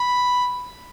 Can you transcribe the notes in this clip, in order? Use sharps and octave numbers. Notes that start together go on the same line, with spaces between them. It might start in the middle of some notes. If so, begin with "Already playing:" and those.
Already playing: B5